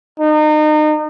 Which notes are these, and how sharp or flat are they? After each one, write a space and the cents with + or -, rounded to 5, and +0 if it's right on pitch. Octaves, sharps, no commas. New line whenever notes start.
D#4 -35